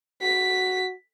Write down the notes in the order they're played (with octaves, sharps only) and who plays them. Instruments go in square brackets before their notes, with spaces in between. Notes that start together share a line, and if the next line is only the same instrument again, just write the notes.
[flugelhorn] F#4 [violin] B6